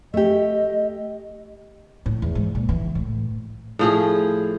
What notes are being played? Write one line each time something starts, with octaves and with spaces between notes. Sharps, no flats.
A3 G4 D#5
A2
E2
G#2
A#2
E3
A2
A2 F3 G#4